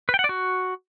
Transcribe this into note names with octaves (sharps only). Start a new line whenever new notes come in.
B4
G5
F#5
D5
F#4